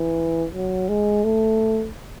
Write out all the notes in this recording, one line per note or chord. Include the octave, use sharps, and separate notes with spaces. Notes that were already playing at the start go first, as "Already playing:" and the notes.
Already playing: E3
F#3
G#3
A3